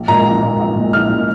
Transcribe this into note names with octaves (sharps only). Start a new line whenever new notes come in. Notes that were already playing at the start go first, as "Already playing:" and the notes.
Already playing: A#1
A#2 G#3 A#5
A#1
A#2 G#3
A#1
A#2 G#3
A#1 F6
A#2 G#3